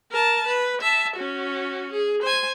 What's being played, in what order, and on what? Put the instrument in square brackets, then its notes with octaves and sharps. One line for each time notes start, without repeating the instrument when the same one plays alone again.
[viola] A#4 A5
B4
E5 A5
C#4 F#4
G#4
C5 G#5